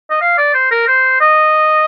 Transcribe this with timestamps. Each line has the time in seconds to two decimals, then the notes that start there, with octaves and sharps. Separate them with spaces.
0.10 D#5
0.21 F5
0.38 D5
0.54 C5
0.71 A#4
0.87 C5
1.21 D#5